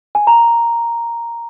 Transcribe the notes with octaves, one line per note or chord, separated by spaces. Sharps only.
G#5
A#5